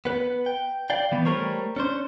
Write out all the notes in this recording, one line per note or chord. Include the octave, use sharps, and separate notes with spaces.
B3 B4
G5
D5 F5 G5
E3 B3
G3 A3 A#4 C5 C#5
C#4 D4 C5